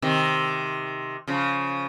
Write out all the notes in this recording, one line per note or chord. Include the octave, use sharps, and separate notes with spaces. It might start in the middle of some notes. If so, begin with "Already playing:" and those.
C3 D#3
C#3 F3